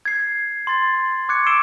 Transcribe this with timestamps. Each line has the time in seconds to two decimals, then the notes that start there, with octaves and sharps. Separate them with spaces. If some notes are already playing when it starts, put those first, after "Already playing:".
0.05 G#6 C7
0.67 C6 A6
1.29 C#6 D6 F#6 G#6 C#7
1.46 C#6 E6 C7 D7 E7 G7